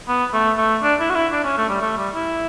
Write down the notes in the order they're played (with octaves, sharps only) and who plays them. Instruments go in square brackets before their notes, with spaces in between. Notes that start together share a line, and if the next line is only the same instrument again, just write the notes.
[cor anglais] B3
A3
A3
D4
E4
F#4
E4
D4
C#4
A3
G3
A3
G3
E4